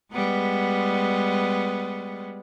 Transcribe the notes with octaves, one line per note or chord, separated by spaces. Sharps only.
G3 G#3 B3